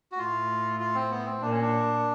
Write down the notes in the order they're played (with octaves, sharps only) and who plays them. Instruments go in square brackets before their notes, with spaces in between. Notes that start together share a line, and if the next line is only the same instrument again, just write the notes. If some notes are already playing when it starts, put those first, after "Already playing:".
[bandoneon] F#4
[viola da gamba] A2 [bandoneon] F4
[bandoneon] F4
C4
B3
C4
[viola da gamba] A#2 [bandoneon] D4
[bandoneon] C#4
D4